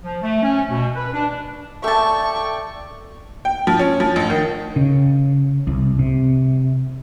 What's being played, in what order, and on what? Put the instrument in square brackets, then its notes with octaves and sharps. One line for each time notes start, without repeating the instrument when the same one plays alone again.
[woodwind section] F3
A3
C#4
B2
B4
D4
[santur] A3 [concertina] D5 G5 [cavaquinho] E5 A5 [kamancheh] C#6
[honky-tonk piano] G5
F3
C#4
F3
A1
D#3
[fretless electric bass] C#3
C2
C3